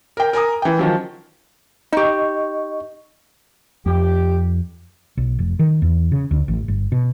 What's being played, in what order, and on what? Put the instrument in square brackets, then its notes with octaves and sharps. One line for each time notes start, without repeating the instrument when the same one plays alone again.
[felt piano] A#4 G5
A#4 G#5 A#5 D#6
E3 G5
D#3 F3 F#3
[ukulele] D#4 G4 [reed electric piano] D#5 C#6
[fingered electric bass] F2 [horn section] G4
[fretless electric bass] B1
F1
D#3
E2
C#3
D2
A1
G1
B2